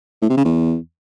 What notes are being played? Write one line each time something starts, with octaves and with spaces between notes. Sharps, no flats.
A2
C3
C#3
E2